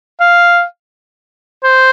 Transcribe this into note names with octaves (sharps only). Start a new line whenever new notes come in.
F5
C5